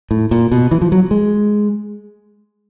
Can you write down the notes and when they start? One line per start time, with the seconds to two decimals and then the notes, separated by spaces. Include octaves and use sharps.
0.11 A2
0.31 A#2
0.52 B2
0.71 E3
0.82 F3
0.92 F#3
1.11 G#3